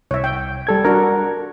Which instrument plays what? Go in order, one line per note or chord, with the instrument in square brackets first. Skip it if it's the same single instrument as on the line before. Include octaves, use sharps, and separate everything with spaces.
[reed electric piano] C2 [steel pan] C#5 E5
[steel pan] G5
[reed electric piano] G3 A4 G#6
[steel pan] D4 F#4 A4 [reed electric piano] A#4